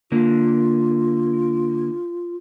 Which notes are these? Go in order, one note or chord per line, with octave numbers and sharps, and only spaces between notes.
D3 A#3 F4